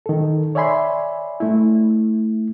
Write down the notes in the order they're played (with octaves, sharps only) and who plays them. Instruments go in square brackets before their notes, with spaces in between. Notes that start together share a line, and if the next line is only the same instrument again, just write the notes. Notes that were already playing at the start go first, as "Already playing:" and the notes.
[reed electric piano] D#3 A4
C#5 D5 E5 G#5 B5 C6
A3 E4